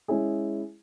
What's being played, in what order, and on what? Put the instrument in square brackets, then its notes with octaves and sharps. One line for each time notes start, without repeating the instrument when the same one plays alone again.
[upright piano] G#3 C#4 E4 G#4